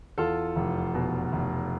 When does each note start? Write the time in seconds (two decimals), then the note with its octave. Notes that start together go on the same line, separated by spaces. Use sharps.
0.18 E2 F4 A4
0.56 F1
0.95 B2
1.33 F1